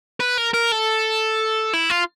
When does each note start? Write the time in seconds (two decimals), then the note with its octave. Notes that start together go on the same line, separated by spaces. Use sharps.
0.20 B4
0.37 A#4
0.53 A#4
0.72 A4
1.73 E4
1.90 F4